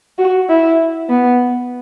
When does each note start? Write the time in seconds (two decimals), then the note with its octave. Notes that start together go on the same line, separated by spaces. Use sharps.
0.19 F#4
0.49 E4
1.09 B3